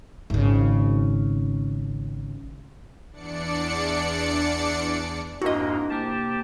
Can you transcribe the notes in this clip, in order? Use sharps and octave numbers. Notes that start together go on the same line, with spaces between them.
G#1 C#3
E2 D4 D5 C#7
F2 G#2 A#3 D4 E4 F#4 A#4 D#5
C3 A#3 G4 A5